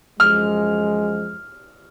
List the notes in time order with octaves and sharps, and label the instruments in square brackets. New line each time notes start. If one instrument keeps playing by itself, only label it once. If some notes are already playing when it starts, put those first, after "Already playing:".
[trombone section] F#2 F3 G#3 [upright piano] F6